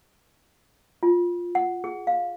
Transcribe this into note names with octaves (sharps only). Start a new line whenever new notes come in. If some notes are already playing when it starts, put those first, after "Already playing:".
F4
F#5
G#4
F5